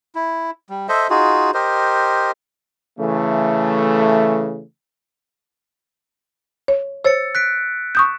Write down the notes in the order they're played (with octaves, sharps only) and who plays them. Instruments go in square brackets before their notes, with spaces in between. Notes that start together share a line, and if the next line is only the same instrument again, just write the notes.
[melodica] E4
G3
A4 C5 D#5 E5
D#4 F4 F#4 G#4
G4 A#4 C5 D#5
[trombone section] C#3 E3 A3
[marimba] C#5
[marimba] C5 C#5 [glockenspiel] E6 A6 C#7
[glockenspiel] F#6 B6 D7
[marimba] C#6 D#6 G6 [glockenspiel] E7